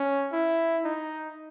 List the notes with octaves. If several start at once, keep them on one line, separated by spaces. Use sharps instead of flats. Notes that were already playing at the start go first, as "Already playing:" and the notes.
Already playing: C#4
E4
D#4